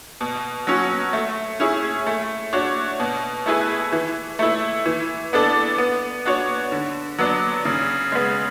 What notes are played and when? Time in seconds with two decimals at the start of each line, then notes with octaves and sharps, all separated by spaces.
0.21 B2
0.67 F#3 C#4 F#4
1.13 A3
1.60 C#4 E4 G#4
2.06 A3
2.53 D4 F#4 C#5
3.00 B2
3.46 A3 E4 G#4 B4
3.92 E3
4.39 A3 E4
4.86 E3
5.33 B3 D4 A4 D5
5.78 B3
6.25 D4 F#4 C#5
6.72 D3
7.18 F#3 B3 D4
7.65 C#3
8.12 G#3 B3